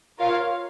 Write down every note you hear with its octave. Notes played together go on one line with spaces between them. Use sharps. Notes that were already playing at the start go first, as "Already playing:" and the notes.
F4 A#4 C#5 F5